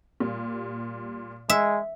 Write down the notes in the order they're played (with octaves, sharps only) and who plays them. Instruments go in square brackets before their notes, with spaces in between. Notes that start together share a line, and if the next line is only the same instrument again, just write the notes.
[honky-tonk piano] A#2 G3
[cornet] G#3 [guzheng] E5